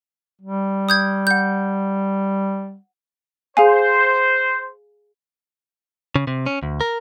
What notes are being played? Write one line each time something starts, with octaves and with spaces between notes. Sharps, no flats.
G3
D#6 G6 G#6
F#5 G6
G#4 C5 F5 G#5
C#3
C3
C#4
D2
A#4